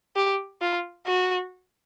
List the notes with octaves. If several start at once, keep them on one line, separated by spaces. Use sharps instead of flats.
G4
F4
F#4